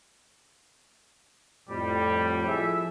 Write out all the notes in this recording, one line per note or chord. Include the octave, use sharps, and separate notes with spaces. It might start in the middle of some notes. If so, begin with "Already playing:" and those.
F2 A2 G3
F3 E4 G#4 A4 E5